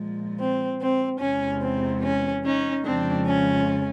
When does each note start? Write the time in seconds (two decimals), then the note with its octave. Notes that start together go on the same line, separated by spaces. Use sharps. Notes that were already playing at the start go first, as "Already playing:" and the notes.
Already playing: A#2 F3 G#3
0.39 C4
0.80 C4
1.20 E2 C3 E3 G#3 C#4
1.61 C4
2.03 C#4
2.44 C#4 D#4
2.85 F2 C#3 F3 G#3 C4 D4
3.26 C#4